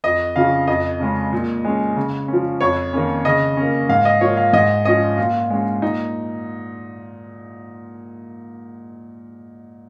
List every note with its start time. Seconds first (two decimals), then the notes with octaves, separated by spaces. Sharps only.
0.04 F2 D#5
0.36 C#3 F3 C#4 F5
0.67 F2 D#5
1.00 C#3 G#3 C#4
1.33 A#2
1.65 G#3 C#4
1.96 C#3
2.28 F3 C#4
2.61 F2 C#5
2.93 D#3 A#3 C#4
3.25 C#3 D#5
3.57 A#3 C#4
3.89 G#2 F5
4.05 D#5
4.21 F3 A#3 C#5
4.37 F5
4.53 G#2 D#5
4.85 F3 C#4 D#5
5.18 A#2 F4
5.50 G#3 C#4
5.82 A#2 D#4